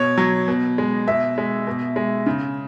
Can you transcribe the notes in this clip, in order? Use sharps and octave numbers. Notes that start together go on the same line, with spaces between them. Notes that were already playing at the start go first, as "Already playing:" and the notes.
Already playing: B2 C#5
F#3
B2
G#3
B2 E5
G#3
B2
G#3
C#3